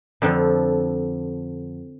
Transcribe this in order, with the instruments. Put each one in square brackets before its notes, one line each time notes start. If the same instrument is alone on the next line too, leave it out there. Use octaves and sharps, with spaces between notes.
[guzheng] F2 D3 F3